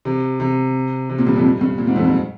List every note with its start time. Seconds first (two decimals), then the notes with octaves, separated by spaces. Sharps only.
0.05 C3
0.40 C3
1.09 C3
1.18 A#2
1.27 G2
1.36 F2
1.44 G2
1.61 G2
1.78 A#2
1.87 G#2
1.96 F2
2.04 G2